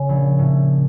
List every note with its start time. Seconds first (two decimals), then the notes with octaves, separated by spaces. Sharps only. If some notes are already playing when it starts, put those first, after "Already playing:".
Already playing: C#3
0.09 A#1
0.39 A2